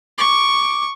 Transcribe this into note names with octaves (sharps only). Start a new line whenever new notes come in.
C#6 D6